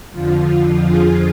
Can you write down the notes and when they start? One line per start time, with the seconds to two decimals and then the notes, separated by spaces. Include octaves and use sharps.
0.12 F2 D3 F3 F4
0.84 F4 G#4